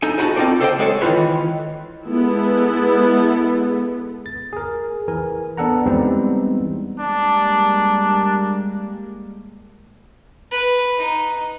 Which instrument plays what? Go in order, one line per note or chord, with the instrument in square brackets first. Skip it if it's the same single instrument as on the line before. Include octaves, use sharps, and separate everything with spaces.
[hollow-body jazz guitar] D#4 A4 G#5
D#4 E4 F#4 G#5 A5
C4 D#4 F4 A4 D5
A4 C5 D5 D#5 F5 G5
G#3 G#4 A4 C#5
D#3 E3 A3 F4 B4 C#5
[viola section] G#3 B3 E4 A4
[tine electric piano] A6
G#4 A#4
E3 A#4 G#5
B3 D4 A4 F#5 A#5
E3 G3 G#3 B3 C4 D#4
[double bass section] G3 G#3 A#3 [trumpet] D4
[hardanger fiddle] B4
D#4